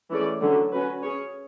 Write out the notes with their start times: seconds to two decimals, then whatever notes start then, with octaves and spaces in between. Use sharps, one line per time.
0.10 E3 A3 C#4 G#4 D5
0.41 D3 F#3 A3 C#4
0.72 C#4 F#4 B4
1.03 C#4 G#4 C#5